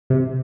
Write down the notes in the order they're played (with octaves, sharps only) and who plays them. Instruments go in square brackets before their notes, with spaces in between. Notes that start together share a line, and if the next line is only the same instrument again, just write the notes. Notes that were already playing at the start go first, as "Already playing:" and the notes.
[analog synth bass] C3